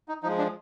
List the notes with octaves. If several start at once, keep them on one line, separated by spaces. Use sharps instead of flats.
D#4
F3 G#3 D#4
D4